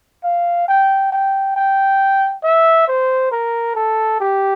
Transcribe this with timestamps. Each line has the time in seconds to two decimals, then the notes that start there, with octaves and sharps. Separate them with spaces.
0.24 F5
0.68 G5
1.12 G5
1.56 G5
2.44 E5
2.88 C5
3.32 A#4
3.75 A4
4.20 G4